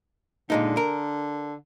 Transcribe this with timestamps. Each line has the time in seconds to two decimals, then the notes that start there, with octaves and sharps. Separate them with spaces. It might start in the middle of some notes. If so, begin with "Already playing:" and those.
0.50 A#2 D3 G#3 D#4
0.77 A#4